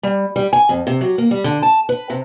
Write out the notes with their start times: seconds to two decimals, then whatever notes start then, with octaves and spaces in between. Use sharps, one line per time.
0.03 G3
0.36 G3
0.53 G#5
0.69 F2
0.87 C3
1.01 F#3
1.18 A#3
1.31 G3
1.44 D3
1.63 A5
1.89 B4
2.10 C3